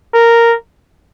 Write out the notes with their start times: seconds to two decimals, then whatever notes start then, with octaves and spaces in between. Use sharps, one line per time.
0.14 A#4